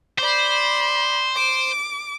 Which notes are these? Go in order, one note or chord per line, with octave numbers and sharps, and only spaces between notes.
C5 D5 B5
D6